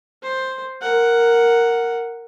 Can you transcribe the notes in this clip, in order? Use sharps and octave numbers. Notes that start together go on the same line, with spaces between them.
C5
A#4 F#5